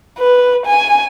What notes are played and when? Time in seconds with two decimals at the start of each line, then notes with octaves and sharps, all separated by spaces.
0.18 B4
0.66 G#5